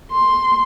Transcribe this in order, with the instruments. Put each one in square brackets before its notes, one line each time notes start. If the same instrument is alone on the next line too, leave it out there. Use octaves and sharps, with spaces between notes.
[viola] C6